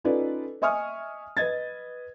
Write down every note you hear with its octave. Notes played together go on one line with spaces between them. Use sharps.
C#4 D#4 F4 A4 B4 D5
D#5 E5 G#5 C#6 D#6 F6
B4 D#5 G#6 A6